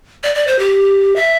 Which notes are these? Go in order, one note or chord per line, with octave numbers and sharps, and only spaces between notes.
D5
D5
C5
G4
E5